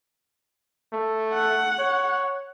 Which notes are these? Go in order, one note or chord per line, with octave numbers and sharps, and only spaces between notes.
A3
F#5
C#5